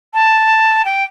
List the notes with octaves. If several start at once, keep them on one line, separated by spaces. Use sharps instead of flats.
A5
G5